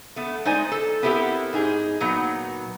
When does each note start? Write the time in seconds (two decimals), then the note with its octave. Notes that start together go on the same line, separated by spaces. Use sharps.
0.16 A3 B3
0.45 G#3 D#4 C5 D5 G#5
0.72 A4
1.02 B3 C4 E4 G4 A4 A#4
1.53 G#2 D#4 G#4
2.00 A#2 F#3 B3 D#4